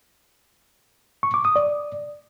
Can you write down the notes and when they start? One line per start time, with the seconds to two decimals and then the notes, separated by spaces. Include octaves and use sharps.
1.23 C#6
1.34 D6
1.45 D#6
1.56 D5